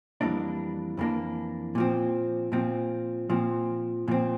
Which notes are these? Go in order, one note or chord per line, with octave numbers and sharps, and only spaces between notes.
F2 E3 G3 A#3 D4
F2 E3 G3 A#3 D4
A#2 F3 C4
A#2 F3 C4
A#2 F3 C4
A#2 F3 C4